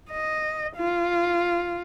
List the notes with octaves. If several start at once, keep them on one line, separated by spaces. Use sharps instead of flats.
D#5
F4